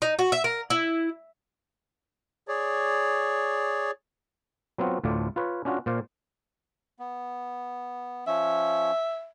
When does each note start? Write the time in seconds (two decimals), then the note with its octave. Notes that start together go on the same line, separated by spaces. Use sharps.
0.02 D#4
0.19 F#4
0.32 E5
0.44 A#4
0.70 E4
2.48 G#4 C#5 D5
4.78 F#3 B3 C4 F4 F#4
5.04 D2 A2 A3 F4 D5
5.36 F4 B4 C#5
5.65 C#4 D4 F4 F#4
5.86 A#2 C5 D5 F5
6.99 B3
8.27 F3 C#4 E5